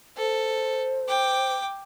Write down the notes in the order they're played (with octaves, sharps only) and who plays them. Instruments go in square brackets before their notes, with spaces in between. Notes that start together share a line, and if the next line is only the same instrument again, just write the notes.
[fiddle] A4 [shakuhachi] C5
[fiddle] G5 D6